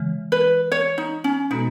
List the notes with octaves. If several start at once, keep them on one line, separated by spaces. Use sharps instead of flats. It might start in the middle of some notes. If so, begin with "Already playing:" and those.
Already playing: C#3 E3 G#3
B4
C#5
D#4
C#4
B2 G#3 B3 D#4 F#4 A4